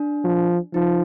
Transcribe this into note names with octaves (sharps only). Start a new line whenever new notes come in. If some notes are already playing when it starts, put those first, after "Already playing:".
Already playing: D4
F3
F3 D#4